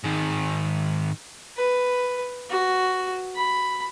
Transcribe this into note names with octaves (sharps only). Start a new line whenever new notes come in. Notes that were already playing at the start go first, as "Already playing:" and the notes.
G#2 D#3
B4
F#4
B5